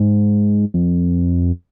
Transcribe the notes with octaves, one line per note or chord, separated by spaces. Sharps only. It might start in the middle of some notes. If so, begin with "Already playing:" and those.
Already playing: G#2
F2